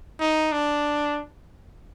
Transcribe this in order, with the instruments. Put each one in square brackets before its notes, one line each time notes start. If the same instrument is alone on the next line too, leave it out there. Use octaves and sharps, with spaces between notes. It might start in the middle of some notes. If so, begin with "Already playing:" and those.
[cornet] D#4
D4